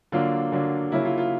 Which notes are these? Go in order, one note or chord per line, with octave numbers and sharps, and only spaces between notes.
D3 F#3 A#3 D4 F4
D3 F#3 A#3 D4
C#3 F#3 A#3 E4
F4
F4